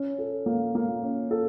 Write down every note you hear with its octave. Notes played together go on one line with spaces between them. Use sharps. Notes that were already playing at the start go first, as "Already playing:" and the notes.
Already playing: C#4
A4
A#3
A#3
C#4
A4